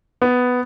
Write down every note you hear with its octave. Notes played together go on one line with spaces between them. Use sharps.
B3